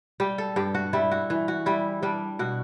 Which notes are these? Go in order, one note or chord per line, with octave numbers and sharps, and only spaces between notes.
G3 G4
A4
G2 G4
F#4
G3 E4
F#4
E3
F#4
G3 E4
G3 D4
B2 F#4